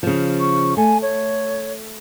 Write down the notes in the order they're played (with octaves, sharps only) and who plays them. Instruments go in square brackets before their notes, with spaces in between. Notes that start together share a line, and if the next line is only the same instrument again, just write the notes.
[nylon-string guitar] C#3 F3
[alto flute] C#6
[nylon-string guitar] A3 [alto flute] G#5
[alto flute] C#5